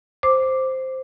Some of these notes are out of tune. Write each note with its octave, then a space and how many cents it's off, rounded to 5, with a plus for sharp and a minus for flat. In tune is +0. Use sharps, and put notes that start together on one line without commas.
C5 +0 D6 +0